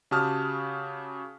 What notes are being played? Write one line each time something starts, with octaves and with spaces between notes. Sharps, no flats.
C#3 F#4 G4 A5 D#6 F6